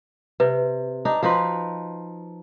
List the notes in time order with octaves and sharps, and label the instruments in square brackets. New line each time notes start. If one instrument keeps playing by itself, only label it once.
[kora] C3 [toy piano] B4
[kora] D4 D#4
[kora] F3 D#4 B4 [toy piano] F#4 C6